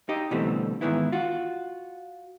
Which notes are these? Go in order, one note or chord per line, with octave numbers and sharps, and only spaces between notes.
D#4 G4 D#5
B2 D3 E3 G3 A3 C4
G#2 D#3 E3 B3 E4
F4 F#4